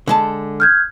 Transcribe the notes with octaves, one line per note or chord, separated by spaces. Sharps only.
D3 G#3 A5
F6 G6 G#6